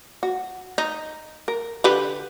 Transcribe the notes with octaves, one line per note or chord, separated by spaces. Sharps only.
F#4
D#4
A#4
D3 G4 B4